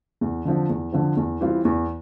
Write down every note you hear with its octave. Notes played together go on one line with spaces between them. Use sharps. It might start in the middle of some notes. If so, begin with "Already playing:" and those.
E2
D3 F3 C4
E2
D3 F3 C4
E2
E3 G3 C4 F4
E2